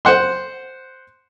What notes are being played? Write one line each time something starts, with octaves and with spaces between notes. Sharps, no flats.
C5 F#5 C6